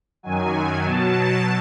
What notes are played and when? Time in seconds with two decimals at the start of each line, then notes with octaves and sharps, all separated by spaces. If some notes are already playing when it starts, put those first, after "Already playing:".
0.23 F#2 D#3 F#3 G#5
0.85 B2 F#3 A5